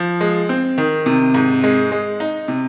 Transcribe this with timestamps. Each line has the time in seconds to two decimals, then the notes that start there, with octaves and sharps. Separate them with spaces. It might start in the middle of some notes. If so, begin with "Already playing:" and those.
Already playing: F3
0.21 G#3
0.49 C4
0.78 D#3
1.06 C3
1.34 G#2
1.64 G#3
1.92 G#3
2.20 D#4
2.48 C3